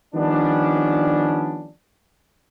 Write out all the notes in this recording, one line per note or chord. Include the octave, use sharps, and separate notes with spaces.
D#3 F3 G3 B3 C#4 D4